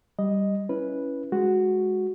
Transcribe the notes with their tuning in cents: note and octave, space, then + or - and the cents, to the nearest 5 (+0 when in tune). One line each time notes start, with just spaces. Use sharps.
G3 +0 D#5 +0
C#4 +5 E4 +0 B4 -10
G#3 +0 F#4 +0